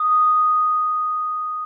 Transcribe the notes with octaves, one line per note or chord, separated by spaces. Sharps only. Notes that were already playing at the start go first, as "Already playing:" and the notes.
Already playing: D#6